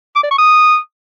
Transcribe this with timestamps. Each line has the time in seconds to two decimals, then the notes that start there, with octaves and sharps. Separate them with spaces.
0.16 D6
0.23 D5
0.31 C#6
0.39 D#6